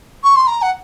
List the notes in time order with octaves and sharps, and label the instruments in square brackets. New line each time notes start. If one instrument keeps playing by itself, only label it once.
[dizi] C#6
C6
A#5
F#5